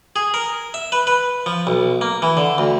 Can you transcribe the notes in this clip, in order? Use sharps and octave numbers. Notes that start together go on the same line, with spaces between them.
G#4
A#4
E5
B4
B4
F3
B1
A#3
E3
D3
D2